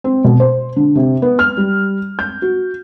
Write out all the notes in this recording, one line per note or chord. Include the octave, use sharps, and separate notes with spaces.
C4
B2
C5
D3
C3
B3
F6
G3
G6
F#4